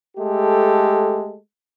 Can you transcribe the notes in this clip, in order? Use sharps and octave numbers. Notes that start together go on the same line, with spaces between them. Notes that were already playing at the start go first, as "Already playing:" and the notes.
G#3 A3 G4 A4